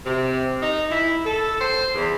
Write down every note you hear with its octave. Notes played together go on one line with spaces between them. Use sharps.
C3
D#4
E4
A4
C5
E2